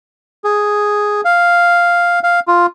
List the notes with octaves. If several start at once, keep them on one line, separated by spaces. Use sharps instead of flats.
G#4
F5
F5
F4